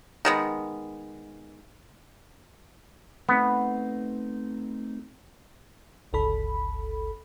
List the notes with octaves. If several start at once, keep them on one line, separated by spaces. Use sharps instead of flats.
D#3 G#3 B3
A3 B3 C4 D#4
G1 C#2 A4 B5